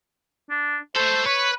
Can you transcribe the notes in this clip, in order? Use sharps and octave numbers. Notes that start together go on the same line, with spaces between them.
D4
A3 A4 C5
B4 C#5